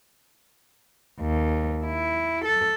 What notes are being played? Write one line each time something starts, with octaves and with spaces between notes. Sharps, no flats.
D#2
E4
A4